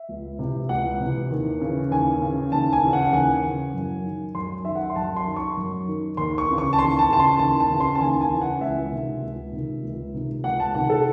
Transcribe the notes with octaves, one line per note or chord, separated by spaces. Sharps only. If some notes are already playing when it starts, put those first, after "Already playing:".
Already playing: E5
C#2
C3 E3
C#2 F#5
C3 E3
D#2
C#3 E3
D#2 G#5
C#3 E3
D#2 A5
G#5
C#3 E3
F#5
F#5
D#2 G#5
C#3 E3
F#2
D#3
F#2 C6
D#3 E5
F#5
C6
F#2 A5
C6
D#3
C#6
F#2
D#3
D#2 C6
C#6
C#3 E3
C#6
A5
D#2 C6
A5
C#3 E3 A5
C6
D#2 A5
A5
C#3 E3
C6
A5
D#2 G#5
G#5
C#3 E3
F#5
C#2 E5
C3 D#3
C#2
C3 D#3
C#2
C3 D#3
C#2 F#5
A5
C3 D#3 F#5
A4